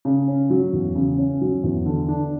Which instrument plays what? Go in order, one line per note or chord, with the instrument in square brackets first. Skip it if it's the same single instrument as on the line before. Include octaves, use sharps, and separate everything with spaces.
[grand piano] C#3
C#4
F#3
E2
C#3
C#4
F#3
E2
D3
D4